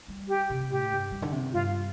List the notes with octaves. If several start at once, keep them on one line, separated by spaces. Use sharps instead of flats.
G3
G4
C3
A2 G4
G2
G2
D3
C3
G2 F4